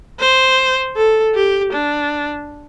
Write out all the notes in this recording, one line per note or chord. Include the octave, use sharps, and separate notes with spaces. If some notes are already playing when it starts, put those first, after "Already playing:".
C5
A4
G4
D4